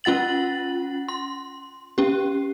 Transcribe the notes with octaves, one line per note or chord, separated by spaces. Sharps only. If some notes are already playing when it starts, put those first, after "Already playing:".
C#4 F4 F#5 A6 F#7
C6
C#4 G4